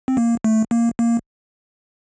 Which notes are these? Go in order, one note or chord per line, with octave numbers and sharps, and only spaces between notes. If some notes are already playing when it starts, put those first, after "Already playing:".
C4
A#3
A3
A#3
A#3